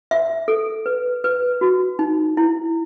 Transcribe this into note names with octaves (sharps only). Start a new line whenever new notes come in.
E5
A4
B4
B4
F#4
D#4
E4